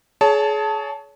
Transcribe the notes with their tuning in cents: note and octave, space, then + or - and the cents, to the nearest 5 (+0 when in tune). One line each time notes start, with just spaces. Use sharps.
G#4 +30 C#5 +25 A5 +0